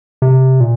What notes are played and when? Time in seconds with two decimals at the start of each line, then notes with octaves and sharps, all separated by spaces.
0.22 C3
0.61 A#2